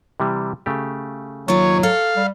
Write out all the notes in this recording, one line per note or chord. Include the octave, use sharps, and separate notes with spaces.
C3 E3 G3
C#3 A3 G4
D#2 F#3 F4 C#5
A4 C#5 F5
G3